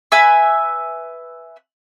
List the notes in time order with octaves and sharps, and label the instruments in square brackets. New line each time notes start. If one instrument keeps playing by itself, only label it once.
[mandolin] B4 E5 G#5 E6